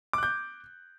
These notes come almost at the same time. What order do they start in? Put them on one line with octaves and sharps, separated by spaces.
D6 F#6 G6